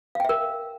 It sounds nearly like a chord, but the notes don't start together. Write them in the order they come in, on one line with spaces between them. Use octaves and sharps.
F5 G5 E5 A#4